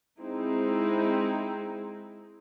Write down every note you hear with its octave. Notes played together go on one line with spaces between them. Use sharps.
G#3 C4 D#4 E4